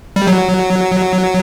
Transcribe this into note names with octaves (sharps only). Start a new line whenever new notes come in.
G3
F#3